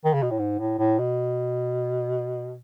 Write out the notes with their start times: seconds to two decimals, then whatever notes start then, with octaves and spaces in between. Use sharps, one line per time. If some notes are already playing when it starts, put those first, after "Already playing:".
0.05 D#3
0.14 C#3
0.23 B2
0.31 A2
0.39 G#2
0.59 A2
0.79 A2
0.99 B2